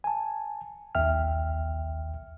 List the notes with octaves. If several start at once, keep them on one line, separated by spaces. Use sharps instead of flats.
G#5 A5
A#1 D#2 E5 G5 F6